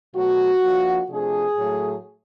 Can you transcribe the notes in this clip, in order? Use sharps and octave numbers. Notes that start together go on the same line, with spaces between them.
B2 F#3 A3 F#4
F3 A#3 D4
C3 F3 A3 D4 G#4
A2 F#3 A3